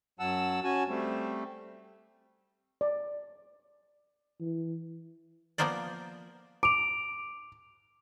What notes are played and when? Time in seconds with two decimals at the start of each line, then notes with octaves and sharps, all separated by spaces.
0.19 F#2 F#3 F#5 A5 E6
0.64 C#4 F#4 G#5 A5
0.88 G3 A3 C4
2.81 D5
4.40 E3
5.58 F3 A#3 B3 A#4 C5 D5
6.63 D6 D7 F7